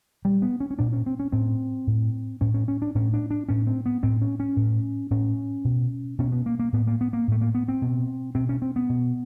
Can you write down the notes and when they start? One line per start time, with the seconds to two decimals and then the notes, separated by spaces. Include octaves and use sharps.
0.25 A#2 G3
0.42 B3
0.60 C#4
0.71 C#4
0.79 A#2 D4
0.93 C#4
1.06 C4
1.20 C#4
1.32 A2 C4
1.87 A2
2.41 A2 C#4
2.54 C#4
2.68 C#4
2.82 D4
2.95 A2 C#4
3.13 D4
3.31 D4
3.49 A2 C#4
3.67 C4
3.86 B3
4.03 A2 C4
4.21 C#4
4.40 C#4
4.56 A2
5.11 A2 C#4
5.65 B2
6.19 B2 C#4
6.32 B3
6.46 A#3
6.59 A#3
6.73 A2 B3
6.87 A#3
7.01 B3
7.13 A#3
7.28 A2 A3
7.41 A#3
7.55 B3
7.68 C4
7.82 B2
8.35 B2 C4
8.49 C#4
8.62 C4
8.76 B3
8.89 B2